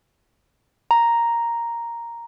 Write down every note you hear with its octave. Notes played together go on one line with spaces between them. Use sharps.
A#5